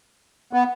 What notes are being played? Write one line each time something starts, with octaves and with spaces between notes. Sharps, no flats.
B3